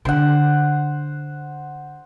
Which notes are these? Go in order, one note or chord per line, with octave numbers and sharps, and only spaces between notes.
D3 C5 F#5